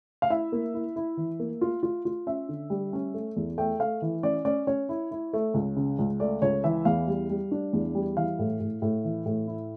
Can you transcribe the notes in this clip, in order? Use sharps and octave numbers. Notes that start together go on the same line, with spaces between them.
F5
E4 E5
A#3
E4
E4
E3
A#3
F4
F4
F4
C#4 E5
D3
G3
C#4
A3
E2
A3 G5
A3 F5
E3
C#4 D5
C#4 D5
C#4 C#5
E4
E4
A3
C#2
C#3
C#2
A3 D5
C#2 C#5
E3 E5
E2 F5
G3
G3
D4
E2
G3
E3 F5
A2
A2
A2
E3
A2
E4